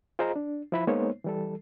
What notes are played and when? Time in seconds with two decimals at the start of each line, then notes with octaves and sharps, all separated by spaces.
0.19 F4 G#4 C5 D#5 F5 A#5
0.36 D4
0.72 F3 E4 B5
0.87 G#3 A#3 B3 D#4 C5 C#5
1.24 E3 G3 A4